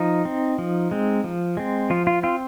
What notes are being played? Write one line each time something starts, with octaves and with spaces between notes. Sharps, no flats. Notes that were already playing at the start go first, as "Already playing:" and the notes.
Already playing: F3 D#4
C4
F3
G#3 C4
F3
G#3 C4
F3 F4
F4
C4 F4